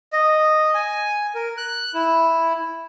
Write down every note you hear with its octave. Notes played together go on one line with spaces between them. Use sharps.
D#5
G#5
A#4
F#6
E4